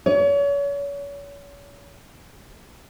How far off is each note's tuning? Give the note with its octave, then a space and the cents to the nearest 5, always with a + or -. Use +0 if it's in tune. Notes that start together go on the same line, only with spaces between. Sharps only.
C#5 +35